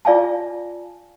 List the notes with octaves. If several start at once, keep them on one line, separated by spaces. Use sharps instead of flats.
F4 D5 F5 G#5 A5